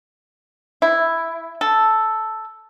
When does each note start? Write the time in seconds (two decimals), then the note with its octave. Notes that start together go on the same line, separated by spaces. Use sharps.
0.82 E4
1.61 A4